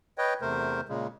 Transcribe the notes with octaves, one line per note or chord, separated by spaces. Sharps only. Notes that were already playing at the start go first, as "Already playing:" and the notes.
B4 C#5 D#5 G5
E2 C3 A3 A#4 C5
A#2 C#3 G#3